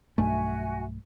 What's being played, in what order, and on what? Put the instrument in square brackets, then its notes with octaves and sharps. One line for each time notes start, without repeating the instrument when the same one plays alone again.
[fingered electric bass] B1 G2 A3 [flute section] F#4 E5 G#5